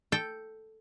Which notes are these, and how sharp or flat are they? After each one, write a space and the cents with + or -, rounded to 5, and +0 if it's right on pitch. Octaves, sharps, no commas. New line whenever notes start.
A4 +0 G5 +0